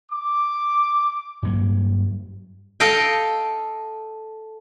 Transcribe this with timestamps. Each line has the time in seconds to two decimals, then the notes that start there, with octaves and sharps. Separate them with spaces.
0.11 D6
1.43 G2 F#3 A#3
2.80 A4 D#5 F5 G5